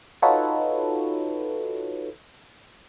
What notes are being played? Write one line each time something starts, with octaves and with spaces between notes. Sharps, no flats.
D#4 F4 F#4 A4 B4 C#5